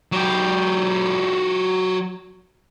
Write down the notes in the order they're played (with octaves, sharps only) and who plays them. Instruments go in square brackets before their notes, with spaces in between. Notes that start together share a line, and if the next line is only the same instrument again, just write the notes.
[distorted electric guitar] F#3 G4